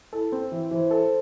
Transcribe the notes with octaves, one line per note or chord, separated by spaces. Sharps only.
E4 A4
C4
E3
E3 C5
A4